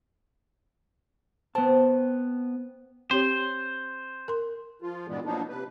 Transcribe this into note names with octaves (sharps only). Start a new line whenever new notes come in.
B3 C4 A5
C4 G4 C5 C#5
A#4 C6
F3 F4
G2 A#2 E3 G3 G#3 B3
F3 F#3 A#3 B3 D4 D#4
C3 B4